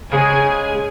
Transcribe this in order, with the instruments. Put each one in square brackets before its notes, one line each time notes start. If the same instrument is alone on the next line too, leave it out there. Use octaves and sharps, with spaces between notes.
[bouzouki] C#3 G#3 C#4 [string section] G#4 G#5 G#6